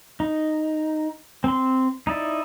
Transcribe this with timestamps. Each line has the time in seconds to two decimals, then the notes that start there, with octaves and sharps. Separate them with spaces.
0.20 D#4
1.44 C4 C6
2.07 D#4 E4 D5